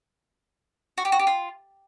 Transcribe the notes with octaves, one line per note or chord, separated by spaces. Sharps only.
F#4
G4
F#4
G4
F4